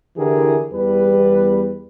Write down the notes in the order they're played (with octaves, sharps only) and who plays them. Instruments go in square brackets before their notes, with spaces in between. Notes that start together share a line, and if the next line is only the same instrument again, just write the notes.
[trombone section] D3 E3 E4 G4 G#4 A#4
E2 G3 B4